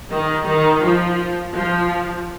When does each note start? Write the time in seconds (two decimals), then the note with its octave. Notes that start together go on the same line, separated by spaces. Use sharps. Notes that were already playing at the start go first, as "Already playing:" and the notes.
0.10 D#3
0.46 D#3
0.83 F3
1.54 F3